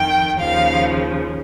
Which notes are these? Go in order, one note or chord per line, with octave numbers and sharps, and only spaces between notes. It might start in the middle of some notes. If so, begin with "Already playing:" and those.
Already playing: F2 D#3 G5
D#2 C#3 F3 F5